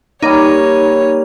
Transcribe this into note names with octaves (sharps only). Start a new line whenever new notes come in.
G3 A#3 D#4 C#5